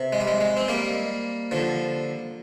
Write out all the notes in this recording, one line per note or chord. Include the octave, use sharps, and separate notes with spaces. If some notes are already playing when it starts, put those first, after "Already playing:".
Already playing: C3
G#3
G3
G#3
G#3
C4
G3 A#3
D3 F3